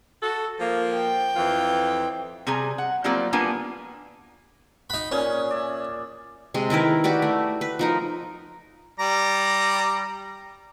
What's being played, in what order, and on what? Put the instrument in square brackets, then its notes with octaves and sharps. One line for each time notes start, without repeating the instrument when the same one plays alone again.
[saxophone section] F#4 A4
F3 A#3
[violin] G5
[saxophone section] F2 E3 F4
[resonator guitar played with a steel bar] C3 G3 G#4 G#5 A#5
F#5
F#3 G3 A#3 C4 F4 D5
G3 A#3 B3 D4 F4 G#5
[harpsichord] D#4 B5 [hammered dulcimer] F#5
[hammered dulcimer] A#2 G#4 [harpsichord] C#4
[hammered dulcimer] D5 E5
[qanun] C3 G#3
D#3 E4 A#4 B4
F#4 G4 B4 D5
A3
B4
F3 D#4 A#4
[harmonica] G3 D5 A#5